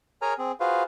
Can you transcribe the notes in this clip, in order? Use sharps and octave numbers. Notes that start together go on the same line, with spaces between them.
G#4 A#4 C#5 G#5 A#5 F6
C4 G#4
F4 F#4 G#4 B4 C5 F5